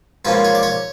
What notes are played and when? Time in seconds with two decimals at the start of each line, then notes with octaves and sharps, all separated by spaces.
0.25 G#2 F3 A#3 C#4 B4
0.45 C#5
0.55 D5
0.63 C#5